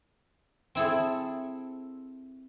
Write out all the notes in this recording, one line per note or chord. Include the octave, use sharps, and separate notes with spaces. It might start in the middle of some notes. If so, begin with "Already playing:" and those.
C4 E4 G#4 A4